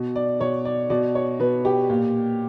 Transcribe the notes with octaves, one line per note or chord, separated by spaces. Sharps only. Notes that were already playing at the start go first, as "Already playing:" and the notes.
Already playing: B2
D5
B2 C#5
D5
B2 D5
C#5
B2 B4
G4
A#2